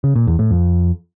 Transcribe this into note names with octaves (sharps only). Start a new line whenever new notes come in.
C#3
A#2
E2
A2
F2